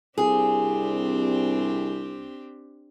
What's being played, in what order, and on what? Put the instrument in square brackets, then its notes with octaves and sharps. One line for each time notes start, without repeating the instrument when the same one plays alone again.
[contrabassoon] C2 [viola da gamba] C4 D4 G4 [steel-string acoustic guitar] G#4